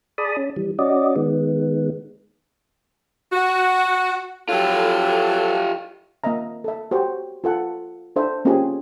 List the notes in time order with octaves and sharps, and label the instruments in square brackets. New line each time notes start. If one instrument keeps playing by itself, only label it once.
[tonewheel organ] G#4 D5 A5 B5 D#6
C#4
E3 G3
C#4 F#4 D5 D#5
D#3 G#3 B3
[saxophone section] F#4
[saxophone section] F3 F#3 A4 [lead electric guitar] F4 G4
[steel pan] A#3 C4 D#5 E5 A#5
A4 E5
F#4 G4 C5
F4 A4 F#5
D4 A4 C5 E5
A#3 C4 C#4 F4 G4 G#4